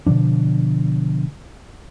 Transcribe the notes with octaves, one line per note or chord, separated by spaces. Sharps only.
B2 D3 F3 D4